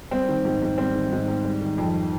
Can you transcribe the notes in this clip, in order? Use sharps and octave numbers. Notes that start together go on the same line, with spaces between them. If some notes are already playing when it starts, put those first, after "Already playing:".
G3 C4
D#3
G#2
G#2
G3 C4
D#3
G#2
G#2
G3
D#3
F2